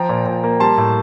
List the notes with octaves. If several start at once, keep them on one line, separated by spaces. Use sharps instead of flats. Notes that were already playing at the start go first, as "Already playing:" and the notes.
Already playing: F3 G5 A#5
A#2
A#2
A#3
G3 A5 C6
A2